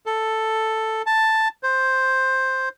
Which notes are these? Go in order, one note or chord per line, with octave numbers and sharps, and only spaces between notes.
A4
A5
C5